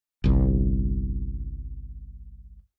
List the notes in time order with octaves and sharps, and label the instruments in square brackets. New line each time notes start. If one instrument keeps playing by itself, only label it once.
[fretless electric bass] G1 C2